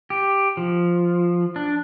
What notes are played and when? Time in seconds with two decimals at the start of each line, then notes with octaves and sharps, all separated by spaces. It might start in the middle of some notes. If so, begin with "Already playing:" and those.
0.10 G4
0.57 F3
1.56 D4